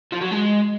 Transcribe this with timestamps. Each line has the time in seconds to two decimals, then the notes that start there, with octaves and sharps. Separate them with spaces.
0.12 F3
0.21 F#3
0.31 G#3